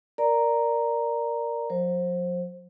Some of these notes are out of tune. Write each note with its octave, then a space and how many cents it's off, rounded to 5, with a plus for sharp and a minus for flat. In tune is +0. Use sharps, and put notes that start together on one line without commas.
A#4 +0 D5 +0 A#5 +0
F#3 -45 C5 +20